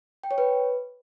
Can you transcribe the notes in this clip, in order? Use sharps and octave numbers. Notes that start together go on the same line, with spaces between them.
G5
C#5
B4